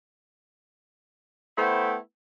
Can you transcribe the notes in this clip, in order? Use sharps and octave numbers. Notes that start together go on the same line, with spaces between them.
A3 B3 E4 C5 G5